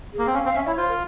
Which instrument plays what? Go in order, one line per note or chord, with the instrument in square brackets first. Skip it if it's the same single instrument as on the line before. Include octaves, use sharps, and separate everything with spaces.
[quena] G#4
[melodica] A#3
C4
[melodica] C#4 [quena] F5
[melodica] C4 [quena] F5
[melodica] C#4 [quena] E5
[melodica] E4 [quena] C#5
[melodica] F4 [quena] C5
[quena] A#4